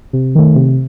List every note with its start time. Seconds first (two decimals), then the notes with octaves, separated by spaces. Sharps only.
0.13 C3
0.35 D#3 A3
0.55 C3